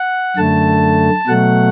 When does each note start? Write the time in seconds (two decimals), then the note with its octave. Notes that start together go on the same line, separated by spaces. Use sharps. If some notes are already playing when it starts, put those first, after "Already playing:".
Already playing: F#5
0.37 F#2 D3 A3 A5
1.27 B2 F#3 A3 F#5